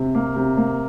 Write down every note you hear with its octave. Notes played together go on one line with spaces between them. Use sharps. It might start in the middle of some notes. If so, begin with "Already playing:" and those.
Already playing: C3
A#3
C3
A#3